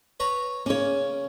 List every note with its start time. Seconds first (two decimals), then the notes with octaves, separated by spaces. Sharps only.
0.20 B4 C#5 A#5
0.66 C#3 A#3 C#4 C#5